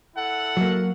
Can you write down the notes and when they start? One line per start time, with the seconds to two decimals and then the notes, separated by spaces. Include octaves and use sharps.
0.16 E4 A4 F#5
0.57 F#3 A#3